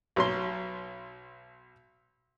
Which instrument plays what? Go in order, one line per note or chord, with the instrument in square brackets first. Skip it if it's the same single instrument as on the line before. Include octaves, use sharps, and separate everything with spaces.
[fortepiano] B1 F#3 C6